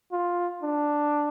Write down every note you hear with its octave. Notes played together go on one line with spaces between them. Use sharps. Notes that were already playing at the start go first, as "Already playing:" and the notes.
F4
D4